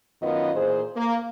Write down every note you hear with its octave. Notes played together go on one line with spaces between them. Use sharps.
F#2 D#3 B3 F4 D#5
A#2 E3 G#4 C5
A#3